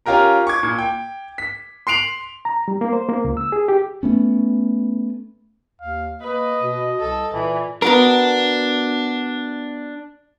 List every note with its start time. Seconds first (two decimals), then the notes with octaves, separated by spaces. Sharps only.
0.06 C#4 F4 G4 A#4 A#5
0.47 C#6 D6 G#6
0.63 A#2 G#6
0.78 G5
1.38 B6
1.87 C6 C7 D7 F7 F#7
2.45 A#5
2.68 G3
2.81 A#3
2.93 C5
3.09 A#3
3.24 C#2
3.37 E6
3.52 G#4
3.68 G4
4.03 A3 B3 C#4
5.81 D#2 F5
6.22 A#3 B4 D#5
6.61 B2
6.99 C2 A4
7.34 A#2 E3
7.82 B3 D4 F#4 A#4